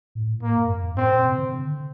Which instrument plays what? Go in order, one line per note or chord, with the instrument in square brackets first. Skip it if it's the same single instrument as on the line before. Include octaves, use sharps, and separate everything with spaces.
[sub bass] A2
[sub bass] A2 [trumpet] A#3
[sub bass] G2
F2
G2
[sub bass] A2 [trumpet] C4
[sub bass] A#2
C3
D3
D3